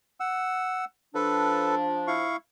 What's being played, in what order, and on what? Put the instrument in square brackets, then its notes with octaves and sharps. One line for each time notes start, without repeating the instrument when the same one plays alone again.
[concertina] F#5 E6
[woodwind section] F3 D4 [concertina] A4 B4
[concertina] E4 F5 C#6